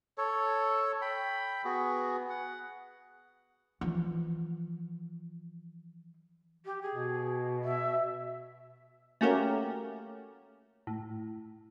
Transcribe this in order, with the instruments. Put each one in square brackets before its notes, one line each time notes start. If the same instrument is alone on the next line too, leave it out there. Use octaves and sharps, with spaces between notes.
[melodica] A4 C#5
G5 B5
B3 F#4 G#4
F#5
[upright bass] E3 F3
[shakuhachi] G4
G#4
[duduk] B2
[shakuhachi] E5
[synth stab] A3 A#3 C#4 F#4 G4 A#4
A2